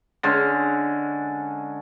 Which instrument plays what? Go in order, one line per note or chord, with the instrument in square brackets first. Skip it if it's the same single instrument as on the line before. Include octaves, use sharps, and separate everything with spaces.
[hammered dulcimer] D3 G#3 C#4